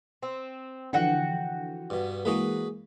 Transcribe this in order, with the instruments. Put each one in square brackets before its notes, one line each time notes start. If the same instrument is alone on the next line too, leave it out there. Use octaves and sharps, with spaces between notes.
[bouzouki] C4
[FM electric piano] D3 E3 F3 [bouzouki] F#4 F#5 G5
[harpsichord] G2 B2
[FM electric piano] E3 G#3 A#3 [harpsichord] F#4 G#4 B4